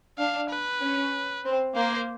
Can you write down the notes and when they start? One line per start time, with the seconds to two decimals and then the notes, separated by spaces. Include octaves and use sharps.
0.18 D4 F5
0.50 B4
0.81 C#4
1.45 C4
1.75 A#3 C5